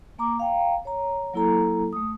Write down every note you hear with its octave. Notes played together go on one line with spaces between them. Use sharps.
A#3 A#5 D6
F5 G5 A#5
C#5 A#5
F#3 A#3 E4 A4 A#5
A3 D#6